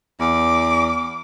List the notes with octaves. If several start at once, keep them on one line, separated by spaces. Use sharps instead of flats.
E2 D6